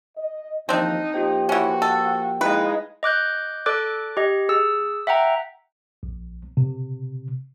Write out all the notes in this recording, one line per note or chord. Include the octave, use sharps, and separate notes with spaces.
D#5
D#2 E3 F3 C4 D4 D#4
F3 A#3 F4 G4 C5 G5
E3 C#4 F#4
A4
G#3 D#4 E4 B4 F5
D#5 D6 F#6 G6
A4 D5 D6 F#6
G4 D#5
G#4 E6
E5 F#5 G5 A#5
A#1
C3